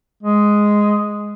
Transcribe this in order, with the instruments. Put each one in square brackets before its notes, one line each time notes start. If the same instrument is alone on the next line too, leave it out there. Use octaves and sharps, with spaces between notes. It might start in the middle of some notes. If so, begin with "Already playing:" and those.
[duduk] G#3